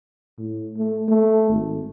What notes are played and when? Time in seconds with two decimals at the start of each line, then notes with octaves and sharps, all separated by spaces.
0.38 A2
0.78 A3
1.09 A3
1.50 G#1